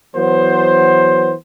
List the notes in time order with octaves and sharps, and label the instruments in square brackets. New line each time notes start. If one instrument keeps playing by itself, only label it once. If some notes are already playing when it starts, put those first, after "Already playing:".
[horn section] E3 F#3 B3 C5